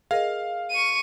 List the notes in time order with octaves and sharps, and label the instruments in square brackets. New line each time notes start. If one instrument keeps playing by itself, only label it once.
[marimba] G#4 A#4 D#5 [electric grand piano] F5
[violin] C#6 D#7